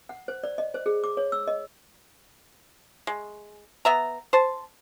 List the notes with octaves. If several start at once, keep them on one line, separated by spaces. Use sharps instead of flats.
F#5
C5
D5
D#5
C5
G#4
D6
C#5
E6
D#5
G#3
B3 E5 A#5
C5 A5